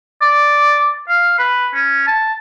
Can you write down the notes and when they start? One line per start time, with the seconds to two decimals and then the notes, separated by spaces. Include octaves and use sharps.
0.21 D5
1.09 F5
1.39 B4
1.74 C#4
2.07 A5